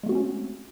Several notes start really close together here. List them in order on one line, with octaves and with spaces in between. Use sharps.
G#3 A3 F#4 C4 C#4